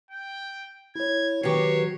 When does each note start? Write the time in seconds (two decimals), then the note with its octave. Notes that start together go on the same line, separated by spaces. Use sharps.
0.11 G5
0.96 E4 C#5 G#6
1.43 D#3 F#3 G4 B4 C#5 C7